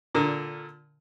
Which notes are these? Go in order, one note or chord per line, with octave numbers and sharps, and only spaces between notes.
A#2 D3 A#4